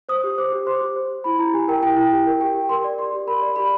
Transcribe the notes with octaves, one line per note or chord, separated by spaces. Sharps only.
C5 D#6
G4
C5 D6
G4
C5 C6
G4
C5
G4
E4 B5
E4 A#5
G4 G#5
A#4 G5
E4 G5
E4
G4
A#4
G4 G5
G4
A#4 C6
D5
G4 C6
G4
A#4 B5
D5
G4 B5